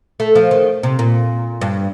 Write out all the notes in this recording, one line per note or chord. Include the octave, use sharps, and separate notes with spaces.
A3
F3
D#3
C3
A#2
G2